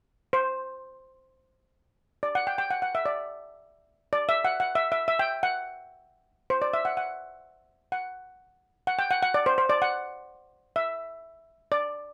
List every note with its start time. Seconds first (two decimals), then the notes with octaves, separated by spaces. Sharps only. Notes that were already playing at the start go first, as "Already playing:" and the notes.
0.33 C5
2.23 D5
2.35 F#5
2.47 G5
2.58 G5
2.71 F#5
2.82 F#5
2.95 E5
3.06 D5
4.13 D5
4.29 E5
4.45 F#5
4.60 F#5
4.75 E5
4.92 E5
5.08 E5
5.19 G5
5.43 F#5
6.50 C5
6.62 D5
6.74 E5
6.85 F#5
6.97 F#5
7.92 F#5
8.87 F#5
8.99 G5
9.11 F#5
9.23 F#5
9.34 D5
9.46 C5
9.58 C5
9.70 D5
9.82 F#5
10.76 E5
11.72 D5